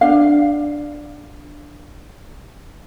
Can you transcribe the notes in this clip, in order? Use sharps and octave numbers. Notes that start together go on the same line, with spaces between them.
D4 F5